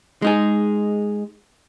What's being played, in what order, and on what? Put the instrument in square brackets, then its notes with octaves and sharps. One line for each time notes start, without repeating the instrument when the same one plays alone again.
[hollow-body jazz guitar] G#3 D#4 G#4